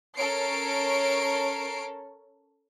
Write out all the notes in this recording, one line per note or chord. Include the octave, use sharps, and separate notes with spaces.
C#4 A4 A#4 C#5 C7 D7